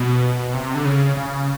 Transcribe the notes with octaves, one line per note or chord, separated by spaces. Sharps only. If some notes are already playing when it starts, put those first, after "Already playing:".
Already playing: B2
C3
D3
C#3
C#3